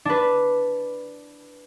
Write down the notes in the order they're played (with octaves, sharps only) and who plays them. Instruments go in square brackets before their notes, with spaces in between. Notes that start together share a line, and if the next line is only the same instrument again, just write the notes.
[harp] D4 B4